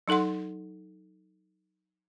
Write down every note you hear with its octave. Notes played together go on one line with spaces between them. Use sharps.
F#3 D#4 A4 F#5 C6